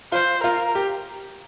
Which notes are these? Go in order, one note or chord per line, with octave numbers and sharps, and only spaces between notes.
F4 C5
F4 A#4
G4